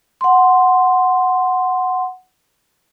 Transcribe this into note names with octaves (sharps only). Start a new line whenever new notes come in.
F#5 C6